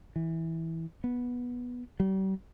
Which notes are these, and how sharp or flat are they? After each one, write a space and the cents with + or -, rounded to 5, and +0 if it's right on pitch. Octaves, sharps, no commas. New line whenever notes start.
E3 -15
B3 -10
G3 -40